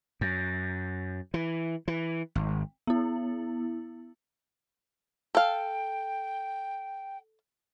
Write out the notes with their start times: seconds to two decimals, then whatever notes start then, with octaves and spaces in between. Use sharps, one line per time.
0.21 F#2
1.34 E3
1.88 E3
2.35 G#1
2.87 B3 E4
5.35 A4 F5 G5